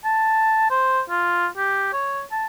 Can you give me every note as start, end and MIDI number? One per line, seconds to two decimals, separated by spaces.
0.05 0.68 81
0.70 1.01 72
1.10 1.47 65
1.57 1.92 67
1.93 2.22 73
2.31 2.46 81